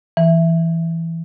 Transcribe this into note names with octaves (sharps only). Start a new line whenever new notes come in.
E3